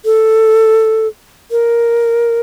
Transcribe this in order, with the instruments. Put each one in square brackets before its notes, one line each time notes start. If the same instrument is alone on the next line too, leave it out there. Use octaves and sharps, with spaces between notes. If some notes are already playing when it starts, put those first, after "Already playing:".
[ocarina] A4
A#4